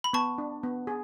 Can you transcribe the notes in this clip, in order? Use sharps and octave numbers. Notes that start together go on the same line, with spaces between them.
B5
B3 A5 C#6
D4
B3
G#4